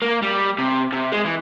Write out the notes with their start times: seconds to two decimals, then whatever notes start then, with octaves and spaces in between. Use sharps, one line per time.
0.02 A#3
0.22 G3
0.58 C3
0.92 C3
1.12 G#3
1.25 E3